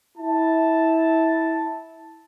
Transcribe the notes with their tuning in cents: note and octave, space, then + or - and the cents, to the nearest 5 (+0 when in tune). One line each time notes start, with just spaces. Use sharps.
E4 -20 A5 +0